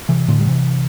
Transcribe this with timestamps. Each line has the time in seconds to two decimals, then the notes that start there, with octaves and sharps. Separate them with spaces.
0.09 C3 E3
0.28 A2 D3
0.39 G3
0.47 C3 E3